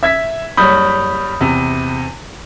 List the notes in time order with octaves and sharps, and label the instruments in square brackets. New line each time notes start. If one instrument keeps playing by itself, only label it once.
[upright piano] E5 G#6 B6
[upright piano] F#1 G3 C#5 [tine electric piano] B5 D#6 G6
[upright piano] E2 C3